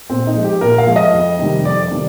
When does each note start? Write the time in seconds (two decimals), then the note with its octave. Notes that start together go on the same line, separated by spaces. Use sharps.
0.10 A#2 C4
0.27 D#4
0.35 F3 G#3
0.45 G4
0.61 A#2 A#4
0.78 F5
0.87 F3 G#3
0.96 D#5
1.13 F2
1.39 C3 D#3 G3
1.65 F2 D5
1.83 D5
1.91 C3 D#3 G3